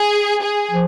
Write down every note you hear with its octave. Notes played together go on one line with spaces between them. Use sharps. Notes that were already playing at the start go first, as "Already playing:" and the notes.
Already playing: G#4
G#4
F3